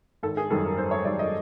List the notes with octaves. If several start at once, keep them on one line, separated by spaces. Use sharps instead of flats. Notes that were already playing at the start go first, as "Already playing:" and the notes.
G#1 A4
G#4
F#2 D#3 G3 A4
A#4
G#1 C5
C#5
F#2 D#3 G3 D5
D#5